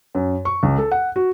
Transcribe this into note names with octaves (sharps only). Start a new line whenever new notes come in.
F#2
C#6
C#2
A4
F#5
F#4